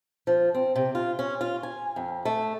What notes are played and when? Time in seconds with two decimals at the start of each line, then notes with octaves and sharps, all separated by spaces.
0.27 F3
0.54 C4
0.76 C3
0.95 F4
1.19 C#4
1.41 F4
1.63 G#5
1.96 F2
2.25 A3